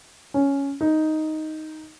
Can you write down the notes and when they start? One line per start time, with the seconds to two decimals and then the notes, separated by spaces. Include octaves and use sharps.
0.34 C#4
0.81 D#4